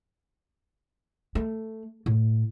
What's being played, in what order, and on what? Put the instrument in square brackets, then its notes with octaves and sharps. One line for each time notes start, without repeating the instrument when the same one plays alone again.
[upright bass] A3
A2